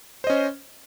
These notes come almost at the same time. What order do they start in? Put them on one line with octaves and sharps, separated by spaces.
C5 D#5 C#4